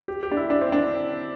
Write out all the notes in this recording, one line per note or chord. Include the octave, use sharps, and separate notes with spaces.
G4
G4
D4
E4
D4
C4
D4